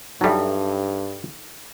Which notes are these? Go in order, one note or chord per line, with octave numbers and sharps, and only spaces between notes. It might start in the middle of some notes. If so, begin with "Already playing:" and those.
G2 F#3 G3 D#4 A4 E5